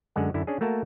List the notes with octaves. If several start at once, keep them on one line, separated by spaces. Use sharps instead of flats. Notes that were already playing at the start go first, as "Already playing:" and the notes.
F#2 D3 G#3 F#5
F#2 D3 E4
C#4 D4 G#4
A3 A#3 F#4 A#4 A5